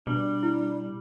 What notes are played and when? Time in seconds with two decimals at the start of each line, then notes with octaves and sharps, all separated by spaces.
0.07 B2 G3 D4
0.43 E4